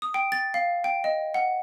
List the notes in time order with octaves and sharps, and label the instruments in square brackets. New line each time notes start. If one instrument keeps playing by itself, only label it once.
[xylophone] D#6
G5
A6
F5
G5
D#5
F#5